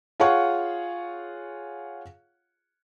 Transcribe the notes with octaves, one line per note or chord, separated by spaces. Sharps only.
F4 G#4 C#5 F5 F#5 C#6